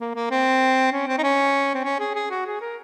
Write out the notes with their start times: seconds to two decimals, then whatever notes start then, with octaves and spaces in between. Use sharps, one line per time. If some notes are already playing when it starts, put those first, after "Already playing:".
0.01 A#3
0.15 A#3
0.31 C4
0.92 C#4
1.08 C4
1.18 D#4
1.23 C#4
1.75 C4
1.84 C#4
2.00 G#4
2.16 G#4
2.31 F#4
2.46 G#4
2.61 A#4